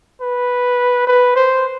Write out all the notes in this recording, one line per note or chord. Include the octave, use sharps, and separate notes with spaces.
B4
B4
C5